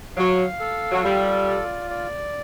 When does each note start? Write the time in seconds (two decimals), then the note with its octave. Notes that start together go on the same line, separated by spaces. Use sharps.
0.16 F#3 F5
0.60 A4
0.92 F#3
1.03 G3 F4
1.47 D5
1.90 D5